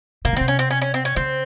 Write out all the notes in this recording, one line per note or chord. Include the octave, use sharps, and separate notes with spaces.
C3 A#3
C#3
C3 C4
C#4
C4
C#4
C#4
C4
C#4
C#3 C4